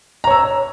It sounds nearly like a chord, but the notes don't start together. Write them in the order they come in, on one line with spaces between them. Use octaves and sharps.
A#5 C#5 E6